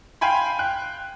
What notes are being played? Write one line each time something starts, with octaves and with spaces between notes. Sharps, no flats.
F5 G5 G#5 B5 C6
G5 F#6